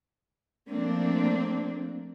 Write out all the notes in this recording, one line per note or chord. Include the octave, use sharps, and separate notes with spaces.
F3 A3 A#3 C4 D4